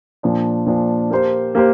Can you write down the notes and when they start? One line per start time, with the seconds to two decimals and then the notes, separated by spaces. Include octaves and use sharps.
0.23 A#2 F3 D4
0.67 A#2 F3 D4
1.10 A#3 G4 C5
1.55 A#3 G4 C5